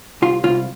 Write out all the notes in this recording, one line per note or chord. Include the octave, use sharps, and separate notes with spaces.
C2 F4
C2 F4